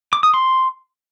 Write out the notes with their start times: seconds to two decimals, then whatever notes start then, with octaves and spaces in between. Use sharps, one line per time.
0.13 D6
0.23 D#6
0.34 C6